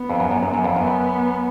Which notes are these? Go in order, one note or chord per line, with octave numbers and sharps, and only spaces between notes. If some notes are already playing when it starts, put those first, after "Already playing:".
Already playing: B3
F2
F#2
F#2
F#2
F#2
F2
F#2 B3